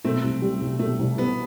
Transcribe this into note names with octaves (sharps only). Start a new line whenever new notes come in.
B2 A3 C4
C2
G3
C2
B2 A3
C2
G3 B3